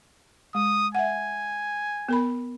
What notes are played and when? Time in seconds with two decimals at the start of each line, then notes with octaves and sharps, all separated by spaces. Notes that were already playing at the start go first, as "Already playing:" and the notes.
0.55 G#3 D#6
0.95 E5 F#5 G#5
2.09 B3 A#4 B5